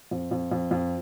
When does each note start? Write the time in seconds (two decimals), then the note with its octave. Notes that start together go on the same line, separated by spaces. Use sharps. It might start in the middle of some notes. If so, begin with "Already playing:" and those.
0.11 F2
0.31 F2
0.51 F2
0.71 F2